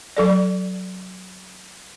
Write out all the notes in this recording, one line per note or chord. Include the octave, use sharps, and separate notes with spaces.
F#3 A4 D5